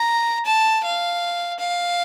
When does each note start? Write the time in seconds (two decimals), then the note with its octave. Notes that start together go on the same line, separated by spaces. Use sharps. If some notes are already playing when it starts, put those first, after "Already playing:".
Already playing: A#5
0.46 A5
0.84 F5
1.59 F5